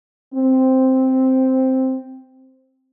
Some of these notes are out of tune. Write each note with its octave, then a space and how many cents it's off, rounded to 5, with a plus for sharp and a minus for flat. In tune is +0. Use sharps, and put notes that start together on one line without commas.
C4 +0